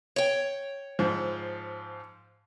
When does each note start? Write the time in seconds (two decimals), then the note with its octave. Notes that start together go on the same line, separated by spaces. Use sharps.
0.16 C#5 G5
0.99 G#2 F3